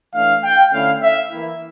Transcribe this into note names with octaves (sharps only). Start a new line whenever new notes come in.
E3 A3 D4 F5
G5
D3 A3 C#4 E4 F5
E5
E3 A#3 E4